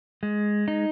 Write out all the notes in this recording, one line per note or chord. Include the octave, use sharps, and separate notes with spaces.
G#3
D#4